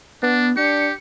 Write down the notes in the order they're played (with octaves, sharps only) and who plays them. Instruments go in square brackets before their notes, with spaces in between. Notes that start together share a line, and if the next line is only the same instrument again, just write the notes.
[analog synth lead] B3 [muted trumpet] D4
[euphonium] D4 [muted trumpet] G4 [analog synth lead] C#7